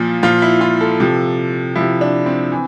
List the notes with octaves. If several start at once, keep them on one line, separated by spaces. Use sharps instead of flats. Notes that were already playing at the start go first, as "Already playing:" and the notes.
Already playing: A#2 F3
A#2 F3 F4
E4
F4
A4
C3 F3
C3 F3 E4
D4
C4
E3